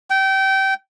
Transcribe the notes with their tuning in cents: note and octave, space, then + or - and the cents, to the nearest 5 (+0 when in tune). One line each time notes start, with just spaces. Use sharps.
G5 -25